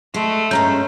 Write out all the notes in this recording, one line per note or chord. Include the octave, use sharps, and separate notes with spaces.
G#3 A3
G2 G#3 C#4 A#5 G6